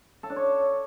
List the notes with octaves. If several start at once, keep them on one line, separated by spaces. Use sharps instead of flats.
A4
D4
C#5